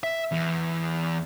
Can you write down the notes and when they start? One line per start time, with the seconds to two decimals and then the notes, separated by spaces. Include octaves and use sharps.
0.03 E5
0.32 E2